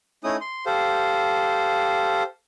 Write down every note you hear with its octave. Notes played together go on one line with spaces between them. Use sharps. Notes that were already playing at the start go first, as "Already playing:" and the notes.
A3 C#4 D#4 E4 D#6
C6
G4 A4 C5 F5